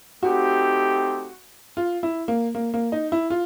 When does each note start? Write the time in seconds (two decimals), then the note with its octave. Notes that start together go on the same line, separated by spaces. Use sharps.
0.23 A3 C4 D#4 F#4 G4
1.77 F4
2.03 E4
2.28 A#3
2.55 A#3
2.74 A#3
2.92 D#4
3.12 E4
3.30 F4